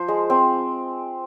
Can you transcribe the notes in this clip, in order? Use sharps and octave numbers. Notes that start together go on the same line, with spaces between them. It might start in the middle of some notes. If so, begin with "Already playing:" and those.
Already playing: F3 C5
G#3
C4